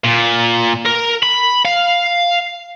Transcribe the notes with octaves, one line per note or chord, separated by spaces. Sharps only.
A#2
A#4
B5
F5